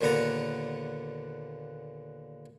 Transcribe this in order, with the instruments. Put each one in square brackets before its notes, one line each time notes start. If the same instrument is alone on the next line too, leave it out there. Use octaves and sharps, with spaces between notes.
[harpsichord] D#2 A#2 D3 B3 F#5 A#5